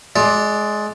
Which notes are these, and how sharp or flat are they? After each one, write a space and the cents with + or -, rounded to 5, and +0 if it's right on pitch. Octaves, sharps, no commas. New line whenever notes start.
G#3 +20 D5 +0